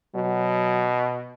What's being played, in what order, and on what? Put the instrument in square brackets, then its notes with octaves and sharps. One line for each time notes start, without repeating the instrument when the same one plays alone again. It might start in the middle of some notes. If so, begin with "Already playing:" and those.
[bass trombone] B2 [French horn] F#3